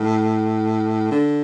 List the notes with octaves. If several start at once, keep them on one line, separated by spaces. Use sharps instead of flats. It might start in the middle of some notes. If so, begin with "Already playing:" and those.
Already playing: A2
D3